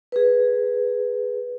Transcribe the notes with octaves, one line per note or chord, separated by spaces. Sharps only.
G#4 B4